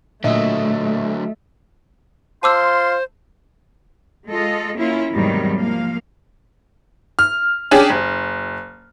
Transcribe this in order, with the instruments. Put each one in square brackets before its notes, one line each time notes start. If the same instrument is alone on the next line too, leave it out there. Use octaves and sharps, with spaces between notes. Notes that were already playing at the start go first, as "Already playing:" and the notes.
[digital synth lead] A#2 [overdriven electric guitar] D3 F#3 [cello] A3 [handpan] D#5 E5
[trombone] F4 [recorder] C5 [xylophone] A5 D6 E6 [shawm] C6
[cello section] G#3 F4 A4 D#5
A#3 C#4 E4 F4
E2 G#2 C3 D#3 F#3 G3
F3 A#3 F5
[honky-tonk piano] F6
C#4 D4 G4 G#4
F#1